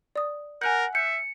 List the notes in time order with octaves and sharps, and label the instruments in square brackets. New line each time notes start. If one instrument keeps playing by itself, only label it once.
[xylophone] D5 D#6
[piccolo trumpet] A#4 [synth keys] F#5 [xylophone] G#5 F#6 G6
[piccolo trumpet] E5 [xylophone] G6 [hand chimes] C#7